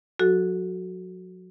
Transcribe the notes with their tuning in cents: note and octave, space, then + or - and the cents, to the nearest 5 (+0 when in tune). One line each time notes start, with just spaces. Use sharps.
F#3 -35 F#4 +0 A4 +0